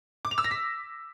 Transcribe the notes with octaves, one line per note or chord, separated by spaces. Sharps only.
D6
F7
E6
A#6
B6